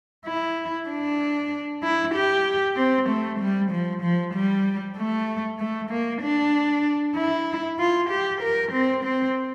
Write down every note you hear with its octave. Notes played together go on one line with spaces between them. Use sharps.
E4
D4
E4
G4
C4
A3
G3
F3
F3
G3
A3
A3
A#3
D4
E4
F4
G4
A#4
C4
C4